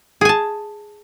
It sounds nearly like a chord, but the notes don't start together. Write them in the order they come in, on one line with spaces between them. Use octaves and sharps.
G#4 G#5 A5